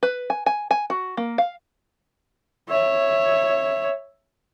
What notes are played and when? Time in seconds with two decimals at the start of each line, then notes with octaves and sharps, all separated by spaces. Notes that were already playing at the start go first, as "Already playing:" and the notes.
0.03 B4
0.30 G#5
0.46 G#5
0.71 G#5
0.90 F#4
1.17 A#3
1.38 F5
2.69 C#5 E5